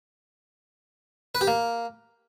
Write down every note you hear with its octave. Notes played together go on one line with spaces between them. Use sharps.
B4
G4
A#3